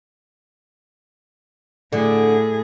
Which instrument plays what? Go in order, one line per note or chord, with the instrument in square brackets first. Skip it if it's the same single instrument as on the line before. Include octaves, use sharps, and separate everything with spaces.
[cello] A2 G#4 [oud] D3